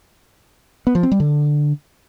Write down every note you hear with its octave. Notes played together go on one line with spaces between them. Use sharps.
B3
F3
C4
G3
D3